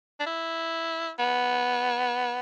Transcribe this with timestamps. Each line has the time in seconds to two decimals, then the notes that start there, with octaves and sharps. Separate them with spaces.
0.20 D4
0.26 E4
1.19 B3